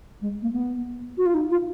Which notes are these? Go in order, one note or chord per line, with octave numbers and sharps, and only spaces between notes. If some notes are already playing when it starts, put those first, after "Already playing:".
G#3
A#3
B3
F#4
F4
D#4
F4